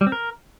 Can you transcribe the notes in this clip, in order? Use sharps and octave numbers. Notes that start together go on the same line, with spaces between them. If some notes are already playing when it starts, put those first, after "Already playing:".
G3
C4
A#4